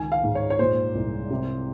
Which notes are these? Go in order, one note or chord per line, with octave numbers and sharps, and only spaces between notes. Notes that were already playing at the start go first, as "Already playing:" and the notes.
Already playing: C#2 D#3 G#5
F5
G#2
C#5
C#5
A#2 C5
C2
C3